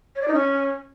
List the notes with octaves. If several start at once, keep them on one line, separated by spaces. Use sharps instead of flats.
C#5
D5
D#4
C#4